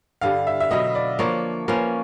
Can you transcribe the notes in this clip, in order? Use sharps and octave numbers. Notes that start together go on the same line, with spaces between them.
G2 D3 G3 F5
E5
E5
B2 F#3 B3 D#5
D5
F3 A#3 D4 C#5
F3 A#3 C#4 B4